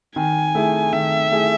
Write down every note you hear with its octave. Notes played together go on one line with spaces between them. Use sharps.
D#3 G#5
A3 E4 G#4
D#3 E5
A3 E4 G#4